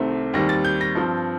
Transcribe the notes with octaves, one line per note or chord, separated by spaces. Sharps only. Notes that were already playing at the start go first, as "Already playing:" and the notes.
Already playing: C2 C3 D#3 A3 C4
D#2 D#3 G3 C4 A#6
A6
G6
A#6
G2 F3 C4